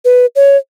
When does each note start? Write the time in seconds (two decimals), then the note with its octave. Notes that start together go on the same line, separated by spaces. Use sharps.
0.05 B4
0.36 C#5